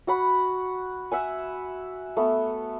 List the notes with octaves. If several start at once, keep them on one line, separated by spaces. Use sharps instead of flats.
F#4 F#5 B5
E5 F#5 G#5
A3 B3